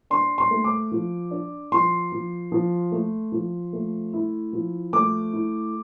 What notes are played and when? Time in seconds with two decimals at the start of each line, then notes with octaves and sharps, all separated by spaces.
0.10 D4 C6
0.38 C6
0.51 A3
0.64 D6
0.92 F3
1.31 D4
1.72 F3 C6
2.12 F3
2.52 F3
2.92 A3
3.32 F3
3.73 A3
4.13 E4
4.53 F3
4.93 A3 D6
5.33 E4